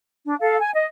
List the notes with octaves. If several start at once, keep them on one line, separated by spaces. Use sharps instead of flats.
D4
A4 F5
G#5
D#5